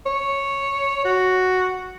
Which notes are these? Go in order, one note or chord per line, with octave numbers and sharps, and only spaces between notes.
C#5
F#4